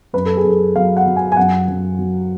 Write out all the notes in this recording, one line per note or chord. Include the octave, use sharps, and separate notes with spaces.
F#2 B4
A4
G#4
F#2 A4
F#3 F5
F#5
F#3
G#5
G#5
F#2 F#5
F#2
F#3